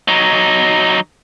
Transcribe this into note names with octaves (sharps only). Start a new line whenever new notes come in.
F#3 D#4